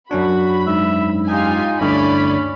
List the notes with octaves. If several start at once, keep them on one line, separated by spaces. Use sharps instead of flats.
F#2 C#4 D4 F#4 B5
G#2 E5
D#4 F4 G4 G#5
D2 G2 D3 C#4 E4 C#5 D5 B5